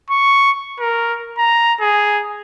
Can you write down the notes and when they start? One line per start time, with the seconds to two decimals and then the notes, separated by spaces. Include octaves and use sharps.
0.10 C#6
0.80 A#4
1.38 A#5
1.81 G#4